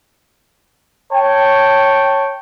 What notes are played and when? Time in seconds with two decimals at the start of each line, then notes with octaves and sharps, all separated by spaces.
1.13 C#5 G5 A5